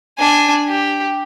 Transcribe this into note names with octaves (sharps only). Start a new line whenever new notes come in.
D4 G#5
G4